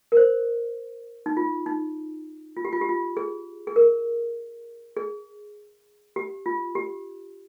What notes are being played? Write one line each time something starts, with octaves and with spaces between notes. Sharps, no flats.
A#4
C5
D#4
F4
D#4
F4
G4
F4
G4
F4
G#4
G#4
A#4
G#4
G4
F4
G4